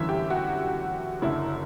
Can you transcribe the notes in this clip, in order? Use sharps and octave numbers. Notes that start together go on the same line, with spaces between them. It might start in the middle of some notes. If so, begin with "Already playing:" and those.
Already playing: G1 F#2 E3 E5
G4
F#4
F#1 F#2 D3 E4